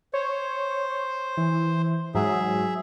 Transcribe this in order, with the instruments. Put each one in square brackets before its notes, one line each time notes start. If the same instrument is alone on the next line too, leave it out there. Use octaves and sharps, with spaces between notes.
[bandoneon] C5 [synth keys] C#5
[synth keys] E3
[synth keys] G#2 F#3 [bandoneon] G#4 E5